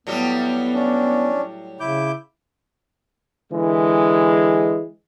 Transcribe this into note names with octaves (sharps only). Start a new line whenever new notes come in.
A2 F#3 G3 B3
C#4 D4
C#3 E4 D6 G6
D3 E3 G#3